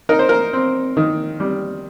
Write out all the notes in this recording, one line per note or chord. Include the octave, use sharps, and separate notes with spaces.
D#4 A#4
C5
A#4
C4
D#3
G3